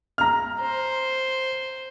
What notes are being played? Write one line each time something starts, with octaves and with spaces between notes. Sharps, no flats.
A#5 F6
C5